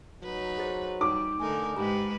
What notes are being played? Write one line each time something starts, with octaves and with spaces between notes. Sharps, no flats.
F#3 D#4 B4
G#4 C5 A6
G3 D#4 D6
D3 A3 D#4 A#4 G#5
G#2 G#3 G4 B4 A#5 B5 D6